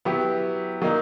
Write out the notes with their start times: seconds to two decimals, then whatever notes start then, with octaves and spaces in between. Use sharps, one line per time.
0.05 F#3 B3 E4 G4
0.82 F#3 A#3 D#4